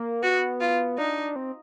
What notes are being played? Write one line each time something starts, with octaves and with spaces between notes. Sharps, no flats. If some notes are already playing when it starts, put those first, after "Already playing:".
Already playing: A#3
B3 F#4
F4
D4 D#4
C4